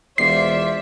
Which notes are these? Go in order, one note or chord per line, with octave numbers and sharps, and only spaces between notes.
E1 F4 C5 D5 E5 C7